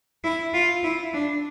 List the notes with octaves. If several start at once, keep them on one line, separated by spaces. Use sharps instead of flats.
E4
F4
E4
D4